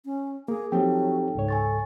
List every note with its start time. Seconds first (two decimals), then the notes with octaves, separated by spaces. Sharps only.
0.05 C#4
0.48 A#3 G#4
0.72 F3 F#3 C4 D#4 G4 A4 G5
1.35 C#2 G#2 C#5
1.48 A4 G#5 C#6 A6